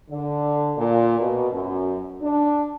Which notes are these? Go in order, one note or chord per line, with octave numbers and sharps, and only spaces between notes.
D3
A#2
B2
F#2
D4